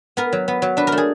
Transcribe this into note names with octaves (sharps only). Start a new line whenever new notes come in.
B3 A#4
F#3
B3
F#3
D4 B4
A#4
A3
G#4